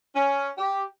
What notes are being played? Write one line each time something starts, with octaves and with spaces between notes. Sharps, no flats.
C#4
G4